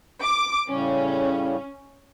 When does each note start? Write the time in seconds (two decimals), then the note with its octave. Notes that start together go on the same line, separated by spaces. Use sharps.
0.22 D6
0.68 A2 C#3 G3 C#4